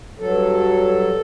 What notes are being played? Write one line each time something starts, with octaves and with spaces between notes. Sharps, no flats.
G2 F#3 A4